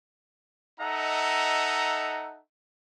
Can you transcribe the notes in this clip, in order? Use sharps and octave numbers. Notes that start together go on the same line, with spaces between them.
D#4 A4 D#5 E5 F#5 A#5